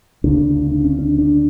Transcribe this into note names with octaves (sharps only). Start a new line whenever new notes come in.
D2 C#3 D4
D4
C#4
D4
D4